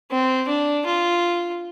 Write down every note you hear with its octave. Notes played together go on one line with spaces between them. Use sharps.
C4
D4
F4